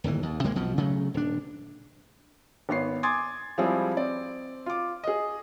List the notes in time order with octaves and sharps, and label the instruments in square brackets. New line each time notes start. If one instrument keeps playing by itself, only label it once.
[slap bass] D1 G1 D#2 E3
D#2
D2 C3 G#3 A#3
B1 B2 F3
C#3 F#3 A3
D#1 D4
[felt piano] G#1 B3 C#5 C7
G#5 C6 D6 D#6 G#6 A6
F3 G3 G#3 C4 E4 G#4
C4 D5
F4 D6
G#4 D#5